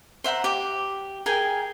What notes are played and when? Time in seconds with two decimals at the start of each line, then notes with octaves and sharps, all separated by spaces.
0.24 C5 E5 F#5 A#5
0.44 G4 D6
1.26 G#4 A#4 G5 G#5